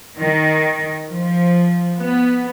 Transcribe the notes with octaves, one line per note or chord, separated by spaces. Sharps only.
D#3
F3
B3